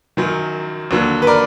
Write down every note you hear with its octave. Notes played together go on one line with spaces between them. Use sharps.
F#2 D#3 F#3
D#2 D3 F#3
B4
A#4 D5